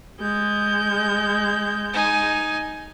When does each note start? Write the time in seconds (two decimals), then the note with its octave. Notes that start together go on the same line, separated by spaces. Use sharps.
0.21 G#3 G6
1.93 D#4 G#5